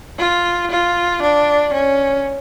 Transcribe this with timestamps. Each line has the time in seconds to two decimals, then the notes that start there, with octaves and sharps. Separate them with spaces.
0.19 F4
0.71 F4
1.23 D4
1.74 C#4